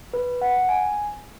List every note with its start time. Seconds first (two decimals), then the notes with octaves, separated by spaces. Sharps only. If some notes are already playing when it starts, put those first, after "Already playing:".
0.13 B4
0.42 F#5
0.69 G#5